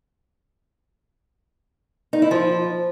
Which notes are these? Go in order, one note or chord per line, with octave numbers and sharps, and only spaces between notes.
D#4
E4
F3